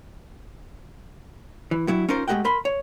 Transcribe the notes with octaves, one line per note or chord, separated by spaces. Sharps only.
E3
G2 F#3 E4
C#4 D#4 F4 A#4 C5
G#3 A3 G4 D#5 F#5 G5
A#4 B5 C6
C#5